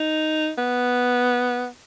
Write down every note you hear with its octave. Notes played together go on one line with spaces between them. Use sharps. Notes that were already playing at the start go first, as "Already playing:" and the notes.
Already playing: D#4
B3